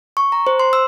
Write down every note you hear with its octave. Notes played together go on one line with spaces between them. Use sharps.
C#6
A#5
C5
C6
E6